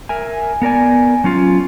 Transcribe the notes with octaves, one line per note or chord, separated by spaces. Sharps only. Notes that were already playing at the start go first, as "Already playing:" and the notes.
A#4 E5 G#5
B3 A#4 D5 G#5
F#3 C#4 F4